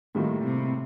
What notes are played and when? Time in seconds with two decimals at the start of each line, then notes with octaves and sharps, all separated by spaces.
0.15 A2 D#3 G3 A#3 F4
0.43 C3